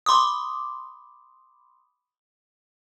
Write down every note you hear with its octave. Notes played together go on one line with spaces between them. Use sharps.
B5 C6 D6 D#6